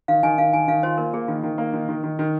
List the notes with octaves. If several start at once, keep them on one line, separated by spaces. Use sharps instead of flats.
D#3 F5
D#3 G#5
D#3 F5
D#3 G#5
D#3 F5
F4 C5
A#3 A#4
A#3 G#4
D#3 F4
D#3
A#3
D#3
D#3
D#3
D#3